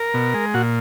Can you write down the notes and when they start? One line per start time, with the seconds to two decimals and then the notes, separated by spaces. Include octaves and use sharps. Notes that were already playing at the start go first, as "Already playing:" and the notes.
Already playing: A#4
0.14 B2
0.34 G#3
0.54 A#2 F#4